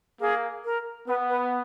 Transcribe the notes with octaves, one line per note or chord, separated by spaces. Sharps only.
A#3 G#4
A#4
B3 B4
B4